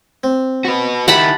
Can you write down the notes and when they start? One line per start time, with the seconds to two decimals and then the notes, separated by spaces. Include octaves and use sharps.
0.24 C4
0.65 F#4 B4
1.08 D#3 E4 G4 F#5 A5 B5